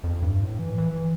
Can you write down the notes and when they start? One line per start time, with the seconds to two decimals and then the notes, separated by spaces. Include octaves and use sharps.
0.04 F2
0.22 G2
0.41 A2
0.59 E3
0.78 E3